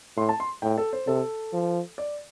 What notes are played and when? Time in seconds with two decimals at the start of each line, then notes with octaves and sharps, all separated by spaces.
0.17 A2 C6
0.29 A5
0.40 C6
0.62 A2 G5
0.78 A4
0.93 C5
1.07 C3 A4
1.53 F3
1.98 D5